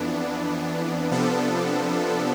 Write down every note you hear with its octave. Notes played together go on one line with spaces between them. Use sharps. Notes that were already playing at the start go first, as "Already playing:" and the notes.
Already playing: F2 E3 B3 D4
C3 F3 B3 D4 A4